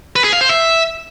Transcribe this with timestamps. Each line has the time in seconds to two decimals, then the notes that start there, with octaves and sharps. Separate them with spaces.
0.16 B4
0.24 G#4
0.33 F5
0.41 C5
0.49 E5